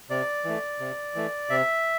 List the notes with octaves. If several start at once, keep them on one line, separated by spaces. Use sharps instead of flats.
C3 D5
E3 A3
C3
E3 A3
C3 E5